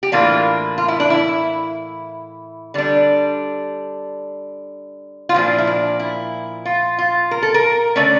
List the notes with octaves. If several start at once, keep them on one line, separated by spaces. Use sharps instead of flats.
G4
A2 E3 A#3 D4 F4
F4
E4
D4
E4
D3 G3 D4
F4
A#2 F3 A#3 D4 E4
E4
D4
E4
F4
F4
A#4
A4
A#4
D3 A3 C#4 D5